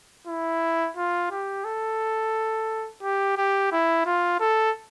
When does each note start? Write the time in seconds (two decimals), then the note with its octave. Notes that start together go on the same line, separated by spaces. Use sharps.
0.27 E4
0.97 F4
1.31 G4
1.64 A4
3.03 G4
3.37 G4
3.72 E4
4.06 F4
4.40 A4